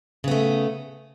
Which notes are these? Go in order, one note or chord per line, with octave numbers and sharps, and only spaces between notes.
C#3 A3 B3